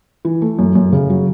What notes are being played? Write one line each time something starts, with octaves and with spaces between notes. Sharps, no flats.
E3
A3
F#2
F#2
C#3
F#3